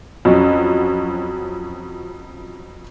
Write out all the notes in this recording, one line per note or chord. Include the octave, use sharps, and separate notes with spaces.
F2 F#3 C#4